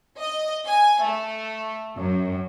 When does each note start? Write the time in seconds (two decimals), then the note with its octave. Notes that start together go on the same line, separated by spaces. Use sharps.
0.20 D#5
0.67 G#5
1.03 A3
1.96 F#2